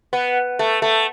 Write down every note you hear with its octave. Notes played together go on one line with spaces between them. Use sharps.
B3
A3
A3